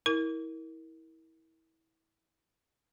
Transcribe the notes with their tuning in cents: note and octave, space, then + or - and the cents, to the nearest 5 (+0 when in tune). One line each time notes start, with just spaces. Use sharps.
E4 -25 A#4 +0